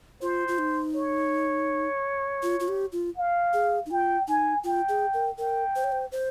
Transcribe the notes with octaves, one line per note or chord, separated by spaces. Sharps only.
F4 C5
F4
D#4
C#5
F4
F4
G4
F4
F5
G#4
D#4
F4 G5
D#4 G#5
F4 G5
G#4
A#4
A#4 G5
C5
C#5
C5
C5